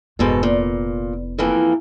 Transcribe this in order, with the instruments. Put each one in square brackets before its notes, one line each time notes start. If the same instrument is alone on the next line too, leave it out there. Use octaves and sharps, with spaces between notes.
[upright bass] F1 B3 [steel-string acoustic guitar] G#2 B2 A4
[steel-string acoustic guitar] A#2
F2 E3 A#3